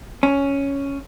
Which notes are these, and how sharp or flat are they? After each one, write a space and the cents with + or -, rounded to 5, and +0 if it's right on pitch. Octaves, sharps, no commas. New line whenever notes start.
C#4 +5